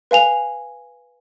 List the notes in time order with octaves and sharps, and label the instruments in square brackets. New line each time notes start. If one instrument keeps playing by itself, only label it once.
[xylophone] B4 F5 G#5 F7